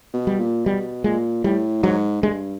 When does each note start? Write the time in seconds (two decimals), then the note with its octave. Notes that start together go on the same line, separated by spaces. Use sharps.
0.14 B2
0.27 G3
0.39 A#2
0.65 B2 G3
1.04 A#2 G#3
1.44 A2 G3
1.83 G#2 F#3
2.22 G2 G#3